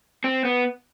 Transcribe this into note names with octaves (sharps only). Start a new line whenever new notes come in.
C4
B3